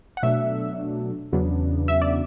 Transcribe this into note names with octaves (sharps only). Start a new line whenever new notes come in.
F#5
B2 F#3 A3 D4 E5
E2 C#3 F#3 B3 D4
E5
D5